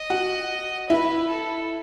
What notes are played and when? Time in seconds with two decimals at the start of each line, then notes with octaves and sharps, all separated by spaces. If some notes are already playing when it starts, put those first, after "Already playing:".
Already playing: D#5
0.10 F#4
0.90 E4 B4
1.29 A4